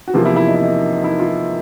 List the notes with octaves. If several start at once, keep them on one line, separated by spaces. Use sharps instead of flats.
F#4
E2 C3 F3 A#3 F4
E4
E4
D#4
E4
D#4
D#4
E4
F4